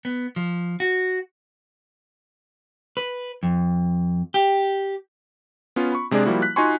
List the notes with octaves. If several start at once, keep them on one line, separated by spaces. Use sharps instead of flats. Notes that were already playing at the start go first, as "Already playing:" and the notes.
B3
F3
F#4
B4
F2
G4
B3 C#4 F4
B5 C#6
C3 G#3 D4 G#4 D5
F3 G3 A#3 E4 F#4
F#6 B6
D#4 F4 F#4 G#5 C6 C#6